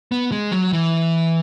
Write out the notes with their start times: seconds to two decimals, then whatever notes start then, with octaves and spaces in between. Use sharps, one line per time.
0.12 B3
0.32 G#3
0.52 F#3
0.73 E3